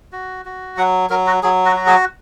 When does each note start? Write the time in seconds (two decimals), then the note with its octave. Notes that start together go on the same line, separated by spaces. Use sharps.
0.12 F#4
0.45 F#4
0.77 F#3 F#5
1.10 F#3 A#4
1.27 F#4
1.43 F#3 G#4
1.65 F#4
1.76 F#4
1.87 G#4